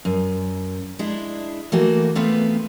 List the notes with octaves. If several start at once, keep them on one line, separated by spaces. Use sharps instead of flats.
F#2
G#3 D4 E4
E3 A3 A#3 F#4
A3 B3 C4 F4 B4